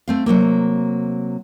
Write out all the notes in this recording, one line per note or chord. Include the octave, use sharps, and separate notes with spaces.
A3 C4 F5
C3 F#3 A3 A#3